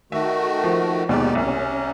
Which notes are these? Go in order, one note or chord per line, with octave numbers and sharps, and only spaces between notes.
D#3 A3 F#4 E5
F3
D#2 B2 G#3 D#4 G4 D5
C2 C#4